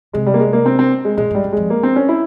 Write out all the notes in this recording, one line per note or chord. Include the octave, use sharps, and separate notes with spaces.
C3 G#3
G3
A#3
G#3
A#3
C4
C4
G#3
A#2 G#3
G#2 G3
G2
F2 G#3
A#3
C4
C#4
E4